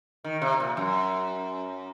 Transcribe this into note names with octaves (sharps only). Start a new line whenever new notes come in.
D#3
C3
A#2
F#2